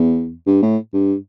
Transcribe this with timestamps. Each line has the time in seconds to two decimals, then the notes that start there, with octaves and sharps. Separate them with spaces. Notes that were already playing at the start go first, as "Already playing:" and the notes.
Already playing: E2
0.47 G2
0.63 A2
0.93 G2